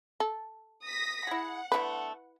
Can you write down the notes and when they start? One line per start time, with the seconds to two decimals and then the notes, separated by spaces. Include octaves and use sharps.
0.20 A4
0.83 D#6 A#6 B6
1.27 E4 G#4 F#5
1.72 D3 A3 B3 E4 B4